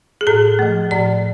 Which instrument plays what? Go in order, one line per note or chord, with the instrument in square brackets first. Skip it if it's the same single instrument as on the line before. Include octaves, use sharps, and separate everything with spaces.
[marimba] G#4
A2 A4
F3 A3
A2 D5